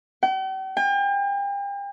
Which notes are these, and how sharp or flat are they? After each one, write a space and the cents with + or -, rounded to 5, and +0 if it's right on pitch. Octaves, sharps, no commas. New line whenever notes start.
G5 -45
G5 +40